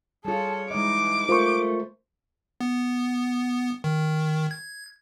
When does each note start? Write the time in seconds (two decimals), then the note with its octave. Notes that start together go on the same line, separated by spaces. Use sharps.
0.25 G3 F4 G#4 A4 C#5
0.71 E3 G#3 D#4 D#5 D6
1.29 A3 F4 A#4 C5 C#6
2.61 B3
3.84 D#3
4.51 G#6